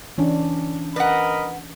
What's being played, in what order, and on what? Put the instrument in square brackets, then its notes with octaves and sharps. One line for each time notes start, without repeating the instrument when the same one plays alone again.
[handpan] E3 C#4 D4
[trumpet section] A#4 D#5 B5 [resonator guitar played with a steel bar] B4 F#5